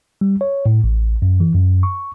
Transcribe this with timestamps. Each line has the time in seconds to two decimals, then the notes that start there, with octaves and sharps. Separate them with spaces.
0.21 G3
0.41 C#5
0.66 A2
0.84 A1
1.22 F#2
1.40 E3
1.55 F#2
1.83 C#6